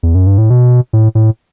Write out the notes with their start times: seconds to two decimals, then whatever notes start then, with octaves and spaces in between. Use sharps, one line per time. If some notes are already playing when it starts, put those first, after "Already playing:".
0.03 E2
0.15 F#2
0.27 G2
0.38 A2
0.50 B2
0.93 A2
1.15 A2